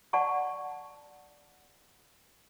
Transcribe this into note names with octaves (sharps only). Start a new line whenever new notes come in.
D5 F#5 A5 C#6